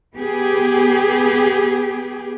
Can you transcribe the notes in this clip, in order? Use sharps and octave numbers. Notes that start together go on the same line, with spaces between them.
B3 G4 G#4